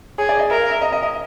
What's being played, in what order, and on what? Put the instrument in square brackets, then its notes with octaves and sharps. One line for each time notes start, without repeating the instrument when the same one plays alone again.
[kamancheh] G#4 [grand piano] C#5
[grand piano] D5
D#5
[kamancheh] A#4 [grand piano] E5
[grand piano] F5
E5
D#5
D#5
D#5